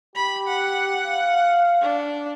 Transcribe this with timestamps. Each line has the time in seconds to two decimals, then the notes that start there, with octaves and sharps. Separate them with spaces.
0.15 G4 B5
0.48 F#5
1.04 F5
1.82 D4